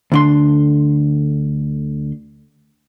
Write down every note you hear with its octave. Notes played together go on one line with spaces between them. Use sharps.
D2 D3 C6